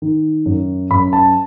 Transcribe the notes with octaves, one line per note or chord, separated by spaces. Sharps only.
D#3
F#2
F#2 B5
A5